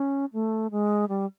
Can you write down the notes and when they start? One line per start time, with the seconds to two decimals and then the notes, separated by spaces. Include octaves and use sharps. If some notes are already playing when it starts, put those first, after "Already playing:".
Already playing: C#4
0.33 A3
0.71 G#3
1.09 G3